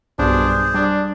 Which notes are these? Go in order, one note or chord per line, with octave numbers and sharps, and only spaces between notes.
B1 G2 D4 G#4 C5
G3 D4